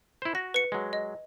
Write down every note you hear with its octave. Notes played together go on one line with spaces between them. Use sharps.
E4 C5
F#4 A#6
B4 C#7
F#3 G#3
D#5